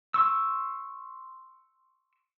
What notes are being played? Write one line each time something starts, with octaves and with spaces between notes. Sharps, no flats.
C6 C#6 E6